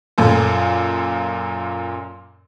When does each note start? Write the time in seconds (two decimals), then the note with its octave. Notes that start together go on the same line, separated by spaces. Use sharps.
0.18 F#2 A#2 A4